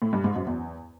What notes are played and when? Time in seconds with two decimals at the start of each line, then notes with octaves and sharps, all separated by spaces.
0.02 A2
0.13 G2
0.24 G#2
0.36 F#2
0.47 E2